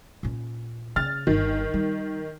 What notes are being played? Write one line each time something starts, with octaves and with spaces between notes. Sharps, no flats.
A#2 C#4
C#3 F6 A6
G1 D#3
G3